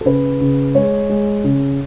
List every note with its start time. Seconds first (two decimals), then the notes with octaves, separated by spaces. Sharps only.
0.01 A4
0.05 C#3 B4
0.41 C#3
0.75 G#3 C#5
1.09 G#3
1.44 C#3